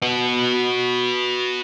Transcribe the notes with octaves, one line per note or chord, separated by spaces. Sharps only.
F#4 B4